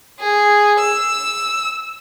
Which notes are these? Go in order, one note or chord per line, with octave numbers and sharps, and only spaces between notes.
G#4
E6